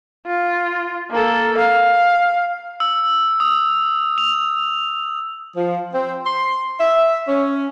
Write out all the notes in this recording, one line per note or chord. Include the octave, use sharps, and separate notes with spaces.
F4
A#3 A4
F5
E6
D#6
F7
F3
C4
C6
E5
C#4